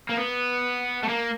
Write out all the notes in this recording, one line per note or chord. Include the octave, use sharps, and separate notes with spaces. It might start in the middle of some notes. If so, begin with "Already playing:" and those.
A#3
B3
A3
A#3